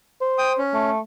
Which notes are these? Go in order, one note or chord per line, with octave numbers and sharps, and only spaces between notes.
C5
G5 D#6
C#4
A3